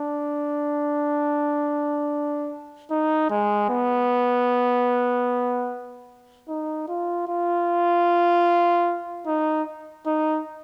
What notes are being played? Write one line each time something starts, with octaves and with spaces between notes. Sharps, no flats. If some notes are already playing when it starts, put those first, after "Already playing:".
Already playing: D4
D#4
G#3
B3
D#4
F4
F4
D#4
D#4